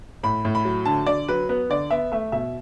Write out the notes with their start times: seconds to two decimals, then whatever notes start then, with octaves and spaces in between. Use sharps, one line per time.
0.23 A2 B5
0.45 A2
0.55 B5
0.65 F#3
0.86 D3 A5
1.07 D3 D5
1.28 F#3 B4
1.49 B3 B4
1.69 D3 D5
1.91 B3 E5
2.12 A3 E5
2.32 B2 E5